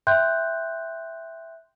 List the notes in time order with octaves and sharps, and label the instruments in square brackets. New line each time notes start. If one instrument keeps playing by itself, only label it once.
[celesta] E5 G5 C6 F#6 G6